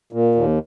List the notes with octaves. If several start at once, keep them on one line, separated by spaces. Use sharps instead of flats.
A#2
D#2